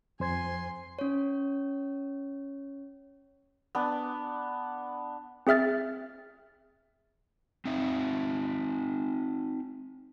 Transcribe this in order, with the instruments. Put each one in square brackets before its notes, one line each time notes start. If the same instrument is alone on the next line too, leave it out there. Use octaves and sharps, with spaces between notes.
[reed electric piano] F2 C5 G#6 [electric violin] G#5 C6
[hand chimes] C#4 C#5
[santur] B3 D4
[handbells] C4 G#4 E5 F6 A6
[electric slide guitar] C4 D#4 E5